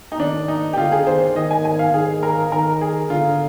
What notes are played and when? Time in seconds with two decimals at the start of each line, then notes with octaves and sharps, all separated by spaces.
0.12 D#4
0.19 D#3 D4
0.48 D#4
0.73 G4
0.78 D3 F4
0.92 G#4
1.07 D#3 C5
1.36 D#3 D#5
1.51 G#5
1.65 G#5
1.79 F5
1.94 D#3 G#4
2.23 A#4
2.52 D#3 A#4
2.81 G#4
3.10 D3 F4